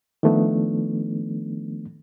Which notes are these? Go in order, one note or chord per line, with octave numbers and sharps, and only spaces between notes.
D#3 F3 A3 B3 D4